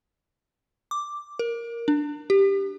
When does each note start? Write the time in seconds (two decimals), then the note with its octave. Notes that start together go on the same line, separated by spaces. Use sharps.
0.91 D6
1.39 A#4
1.88 D4
2.30 G4